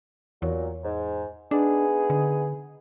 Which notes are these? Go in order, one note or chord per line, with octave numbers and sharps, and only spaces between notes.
E2 A#2 F#3
G#2
B3 D4 D#4 G#4
D3